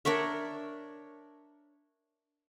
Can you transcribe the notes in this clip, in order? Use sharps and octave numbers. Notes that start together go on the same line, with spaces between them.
D4 A#4 C#5 E5